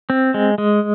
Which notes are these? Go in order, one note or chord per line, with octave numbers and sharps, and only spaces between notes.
C4
G#3
G#3